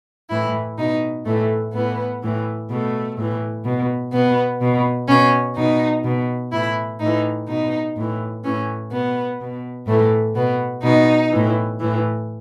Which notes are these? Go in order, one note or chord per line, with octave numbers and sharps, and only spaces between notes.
A2 E3 E4
B2 D#4
A2 E3 A3
A2 E3 B3
A2 E3
B2 A3
A2 E3
B2
B2 B3
B2
B2 C#4
B2 D#4
B2
A2 E3 E4
A2 E3 D#4
B2 D#4
A2 E3
A2 E3 C#4
B2 B3
B2
A2 E3 A3
B2 B3
B2 D#4
A2 E3
A2 E3